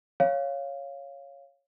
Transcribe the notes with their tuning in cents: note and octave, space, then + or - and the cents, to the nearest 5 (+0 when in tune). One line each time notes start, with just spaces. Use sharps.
C#5 +0 F5 +0